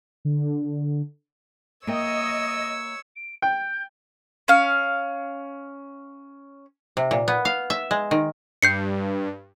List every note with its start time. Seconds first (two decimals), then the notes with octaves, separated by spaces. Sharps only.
0.25 D3
1.87 A#3 C#5 D#5 E5 G5 E6
3.16 D7
3.42 G5 G6
4.48 C#4 F5
6.97 C3
7.11 A#2
7.28 B3
7.45 F5
7.70 E5
7.91 G#3
8.11 D#3
8.62 G2 G6 C7 C#7